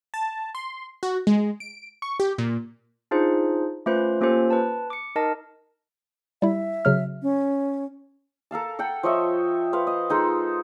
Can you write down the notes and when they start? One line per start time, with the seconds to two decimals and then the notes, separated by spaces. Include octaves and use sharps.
0.14 A5
0.55 C6
1.03 F#4
1.27 G#3
1.60 D7
2.02 C#6
2.20 G4
2.38 A#2
3.11 D4 D#4 F4 G#4 C5
3.86 A3 C#4 F4 B4 C5 C6
4.21 A#3 C#4 F4 G4 A4 C5
4.50 B4 A5
4.90 D6 C#7
5.15 D#4 A#4 D#5 A5
6.42 G3 E4 E5
6.85 C#3 F#3 F6
7.22 C#4
8.51 A4 A#4 F5 A5
8.79 A4 F#5 G5
9.03 F3 C#5 D#5 E5
9.73 B4 C5 F5
9.87 D#5
10.09 G#3 D#4 F4 A4